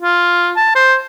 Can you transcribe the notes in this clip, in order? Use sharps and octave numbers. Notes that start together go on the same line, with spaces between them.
F4
A5
C5